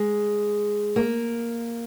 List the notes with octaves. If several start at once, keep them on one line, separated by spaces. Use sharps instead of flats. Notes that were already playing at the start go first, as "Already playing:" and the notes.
Already playing: G#3
A#3